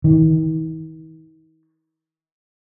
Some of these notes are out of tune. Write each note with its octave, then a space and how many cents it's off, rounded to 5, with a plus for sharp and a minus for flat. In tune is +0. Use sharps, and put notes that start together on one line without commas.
D#3 +45